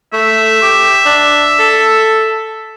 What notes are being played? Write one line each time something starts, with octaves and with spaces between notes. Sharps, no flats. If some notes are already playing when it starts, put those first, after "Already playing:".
A3 E5
G4
D4
A4